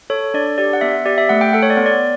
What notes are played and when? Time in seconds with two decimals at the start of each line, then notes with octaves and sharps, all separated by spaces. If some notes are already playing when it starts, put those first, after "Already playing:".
0.10 A4 C#5
0.34 D4 D5
0.58 G4 D5
0.73 F#5
0.81 B3 E5
1.05 G4 D5
1.18 E5
1.29 A3 F#5
1.41 G5
1.53 A4 F#5
1.63 C#5
1.70 D5
1.77 B3
1.86 D5